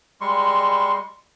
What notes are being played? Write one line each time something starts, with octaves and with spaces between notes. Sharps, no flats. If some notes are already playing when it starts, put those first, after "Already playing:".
G3 G#3 C6 C#6